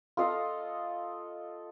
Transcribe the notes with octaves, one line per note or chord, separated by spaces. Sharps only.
F4 A4 D#5 F5